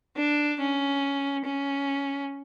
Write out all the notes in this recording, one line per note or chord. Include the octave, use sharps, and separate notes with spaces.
D4
C#4
C#4